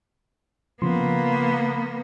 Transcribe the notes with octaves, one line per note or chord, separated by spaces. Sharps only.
C#3 F3 A#3 B3 C6